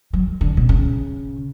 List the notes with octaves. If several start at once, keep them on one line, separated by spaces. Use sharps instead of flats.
F#3
D3
B2
C#3